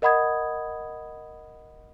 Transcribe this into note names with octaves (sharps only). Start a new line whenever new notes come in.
A#4 D#5 F#5 B5 D#6 G#6